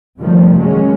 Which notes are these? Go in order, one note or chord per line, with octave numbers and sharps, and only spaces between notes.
F#2 C3 D#3 F3 G3 A3
F#3 G#3 A#3 C#4